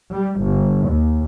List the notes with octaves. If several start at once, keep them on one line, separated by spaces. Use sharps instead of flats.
G3
G1
D#2